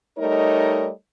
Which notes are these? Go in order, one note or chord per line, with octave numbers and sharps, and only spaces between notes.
G3 A3 D#4 A#4 C#5 D#5